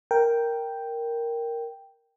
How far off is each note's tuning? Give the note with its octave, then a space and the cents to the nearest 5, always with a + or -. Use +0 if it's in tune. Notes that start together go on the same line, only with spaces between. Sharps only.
A#4 +0 G5 +0